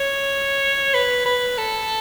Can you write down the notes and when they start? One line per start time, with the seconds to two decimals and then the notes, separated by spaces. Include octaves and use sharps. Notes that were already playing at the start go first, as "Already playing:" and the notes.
Already playing: C#5
0.94 B4
1.26 B4
1.58 A4